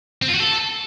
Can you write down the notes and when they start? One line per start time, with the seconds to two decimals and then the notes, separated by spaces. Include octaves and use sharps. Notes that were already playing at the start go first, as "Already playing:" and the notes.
0.22 C4
0.28 F4
0.34 F#4
0.40 A4